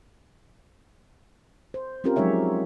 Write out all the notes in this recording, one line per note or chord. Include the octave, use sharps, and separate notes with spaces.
C5
C4 C#4 F4 G4 A#4
F3 F#3 G#3 D#4 C#5 E5